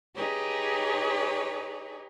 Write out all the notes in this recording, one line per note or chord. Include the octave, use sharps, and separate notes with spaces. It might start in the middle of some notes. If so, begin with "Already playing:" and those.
D#4 G4 G#4 B4 C#5